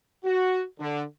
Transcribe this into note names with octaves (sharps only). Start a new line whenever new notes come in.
F#4
D3